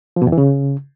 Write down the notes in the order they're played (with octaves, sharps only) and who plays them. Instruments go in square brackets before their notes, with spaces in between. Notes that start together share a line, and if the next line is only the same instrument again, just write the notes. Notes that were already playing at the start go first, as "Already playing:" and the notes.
[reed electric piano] F3
B2
E2
E3
C#3